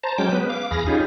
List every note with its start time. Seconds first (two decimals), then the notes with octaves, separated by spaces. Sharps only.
0.03 C5 A5 A#5
0.18 F#3 G#3 C#4 G5 D6
0.32 B3 B4
0.49 F5 D6
0.71 E2 G#4 B5 F6 A#6
0.86 C#4 D#4 F4 G4 G#4